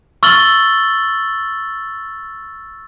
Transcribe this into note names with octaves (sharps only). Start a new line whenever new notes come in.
C#6 E6 F6 A6 F#7 G7